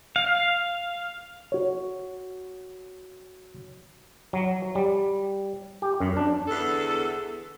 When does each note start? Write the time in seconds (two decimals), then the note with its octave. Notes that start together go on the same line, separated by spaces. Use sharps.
0.16 F5
1.52 F#4 C#5
4.33 F#3
4.75 G3
5.82 G4
6.01 F#2
6.17 D4
6.48 E2 D3 A4